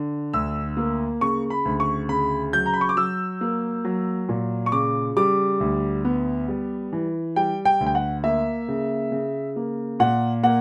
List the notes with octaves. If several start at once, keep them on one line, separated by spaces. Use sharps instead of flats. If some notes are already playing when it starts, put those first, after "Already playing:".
Already playing: D3
D2 E6
A#3
C#3 C#6
B5
D2
C#6
C#3 B5
F#3 G6
A#5
B5
C#6
D6
F#3 E6
A#3
F#3
A#2
C#6
C#3 D6
G3 D6
D2
B3
G3
E3
G3 G5
G5
D2
G5
F#5
A#3 E5
C#3
C#3
A#3
A#2 F#5
A#3 F#5